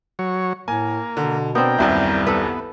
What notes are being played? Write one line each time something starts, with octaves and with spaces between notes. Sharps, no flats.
F#3 C#5
A2 A#3 G#5
B2 D3
B3 C4 D4 A#4 G5
D#1 C2 F#2 G3 E4
B3 A4 B4